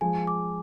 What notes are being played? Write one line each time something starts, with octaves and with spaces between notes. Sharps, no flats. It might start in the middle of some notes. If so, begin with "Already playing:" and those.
F3 G#3 G#5
D6